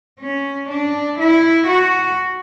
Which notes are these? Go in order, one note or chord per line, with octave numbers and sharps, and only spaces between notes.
C#4
D4
E4
F#4